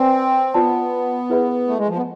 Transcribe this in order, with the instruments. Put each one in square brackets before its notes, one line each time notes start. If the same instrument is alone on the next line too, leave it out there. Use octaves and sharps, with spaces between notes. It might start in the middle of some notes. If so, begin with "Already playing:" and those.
Already playing: [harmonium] C4 [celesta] B4 D5 G#5
[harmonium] B3 [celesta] F4 B4 D5 A5
[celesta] E4 G#4 B4 E5 B5
[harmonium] A3
G#3
F3
B3